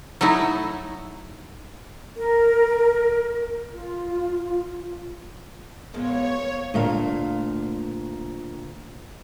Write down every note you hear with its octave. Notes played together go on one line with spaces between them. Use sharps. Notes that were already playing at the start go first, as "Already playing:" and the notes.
F#3 A3 D#4 E4
A#4
F4
A#2 F3 G#3 B3 C#5
D2 A#2 F5